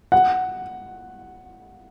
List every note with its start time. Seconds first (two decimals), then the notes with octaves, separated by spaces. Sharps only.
0.12 F#5